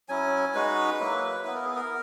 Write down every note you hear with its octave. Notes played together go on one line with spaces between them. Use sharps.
F#3 C#4 E4 G#5
G#3 D#4 F#4 B4
F#3 A#3 E4
B3 E4 B4
A#4
G#4
A#4